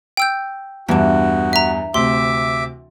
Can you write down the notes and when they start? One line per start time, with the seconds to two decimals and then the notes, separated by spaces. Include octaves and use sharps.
0.17 G5 E6 G6
0.88 E2 G2 E3 D4 F#4
1.53 E5 A#5
1.94 D2 C3 E5 C6 D6